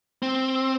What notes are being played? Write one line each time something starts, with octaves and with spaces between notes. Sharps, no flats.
C4